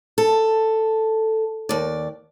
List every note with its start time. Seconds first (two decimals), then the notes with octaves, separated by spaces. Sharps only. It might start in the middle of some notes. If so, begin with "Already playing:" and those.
0.18 A4
1.69 D#2 D5